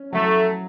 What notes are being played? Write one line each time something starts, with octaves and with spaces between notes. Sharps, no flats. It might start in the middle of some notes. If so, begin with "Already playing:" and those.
Already playing: C#4
F#3 A3